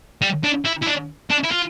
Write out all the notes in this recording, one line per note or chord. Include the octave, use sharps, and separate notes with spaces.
G3
D4
E4
E4
D4
D4
E4
F4